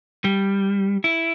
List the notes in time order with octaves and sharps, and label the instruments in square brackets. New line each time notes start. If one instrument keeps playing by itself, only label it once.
[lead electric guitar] G3
E4